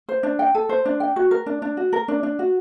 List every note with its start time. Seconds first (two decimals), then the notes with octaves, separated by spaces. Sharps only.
0.09 C5
0.23 D4
0.39 G5
0.55 A4
0.69 C5
0.86 D4
1.00 G5
1.16 F#4
1.31 A#4
1.46 D4
1.62 D4
1.77 F#4
1.93 A#4
2.08 D4
2.23 D4
2.39 F#4